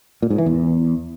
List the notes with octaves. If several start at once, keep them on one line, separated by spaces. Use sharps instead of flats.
A#2
G#2
E3
E2